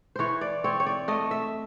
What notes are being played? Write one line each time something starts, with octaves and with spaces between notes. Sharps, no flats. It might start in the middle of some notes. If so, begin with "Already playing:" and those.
E3 C5 C#5
D5
C4 C#5
C#5
D5
A3 D#5
E5